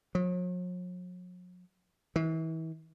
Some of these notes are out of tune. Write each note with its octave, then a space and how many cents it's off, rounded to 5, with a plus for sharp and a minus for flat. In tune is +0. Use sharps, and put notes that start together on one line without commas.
F#3 -45
E3 -35